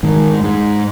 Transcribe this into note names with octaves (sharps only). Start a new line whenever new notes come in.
G#2 D#3
G#2